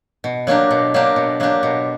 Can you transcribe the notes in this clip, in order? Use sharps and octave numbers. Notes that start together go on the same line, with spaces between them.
B2
F#3 A#3 D4 G4
B2
F#3 A#3 D4 G4
B2
F#3 A#3 D4 G4
B2